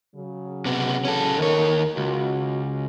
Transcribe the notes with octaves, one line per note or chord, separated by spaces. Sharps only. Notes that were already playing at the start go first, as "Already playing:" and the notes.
C#3 F#3
C3 B3
C#4 A4
D#2 D#3 A#4 C#5
C#2 F#4